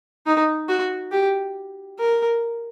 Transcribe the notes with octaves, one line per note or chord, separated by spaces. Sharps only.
D#4
F#4
G4
A#4